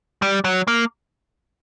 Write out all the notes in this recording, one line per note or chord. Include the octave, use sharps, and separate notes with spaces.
G3
F#3
A#3